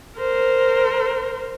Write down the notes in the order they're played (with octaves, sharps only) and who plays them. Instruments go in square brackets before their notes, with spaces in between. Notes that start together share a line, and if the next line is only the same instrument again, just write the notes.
[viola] A#4 C5